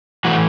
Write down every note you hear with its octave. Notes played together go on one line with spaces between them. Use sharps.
E3 A3 F#4